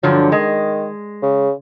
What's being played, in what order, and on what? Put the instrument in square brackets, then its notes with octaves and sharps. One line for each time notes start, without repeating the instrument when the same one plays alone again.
[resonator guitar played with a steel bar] G2 D3 F3 [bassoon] F#3
[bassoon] D#3 [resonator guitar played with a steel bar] G#3
[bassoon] C#3